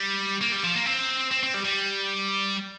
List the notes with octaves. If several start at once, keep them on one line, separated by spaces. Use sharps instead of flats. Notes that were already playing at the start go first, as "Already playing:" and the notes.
Already playing: G3
A#3
G3
F3
A#3
C4
C4
C4
G3
G3